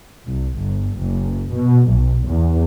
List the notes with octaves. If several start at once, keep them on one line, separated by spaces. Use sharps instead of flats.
C2
G1
F#1
B2
B1
E2